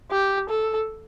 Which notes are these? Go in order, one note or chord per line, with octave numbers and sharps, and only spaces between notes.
G4
A4